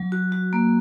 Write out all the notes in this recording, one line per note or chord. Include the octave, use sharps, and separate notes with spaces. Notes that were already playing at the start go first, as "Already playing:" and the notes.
Already playing: F#3
F#4
F#4
A#3